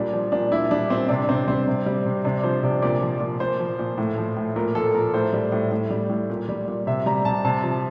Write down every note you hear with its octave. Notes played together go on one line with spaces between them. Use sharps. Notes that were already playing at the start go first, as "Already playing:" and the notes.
Already playing: A#2 G3 D4
F3
A#2 D4
A#2 E4
G3 D4
A#2 C4
C3 D4
C3 C4
G3 C4
C3
G3
C3
C3 D4
F3 C5
C3 D5
A#2 D5
F3
A#2
A#2 C5
F3
A#2
A2
F3
A2
A#2 A#4
F3 A4
A#2 A#4
A2 C5
G3
A2
A2
G3
A2
A#2
G3
A#2
C3 E5
G3 A#5
C3 A5
C3 A5
F3